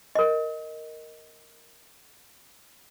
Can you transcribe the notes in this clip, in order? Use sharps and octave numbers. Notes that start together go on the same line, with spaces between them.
A#4 D#5